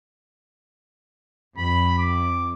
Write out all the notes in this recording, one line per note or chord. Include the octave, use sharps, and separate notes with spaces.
F2 B5
D6